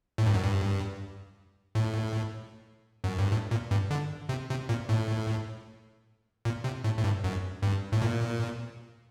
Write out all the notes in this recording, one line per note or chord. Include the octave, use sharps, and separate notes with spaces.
A2
G2
F#2
G2
A2
F#2
G2
A2
A#2
G2
D3
C3
C3
A#2
A2
A#2
C3
A2
A2
G2
F#2
G2
A2
A#2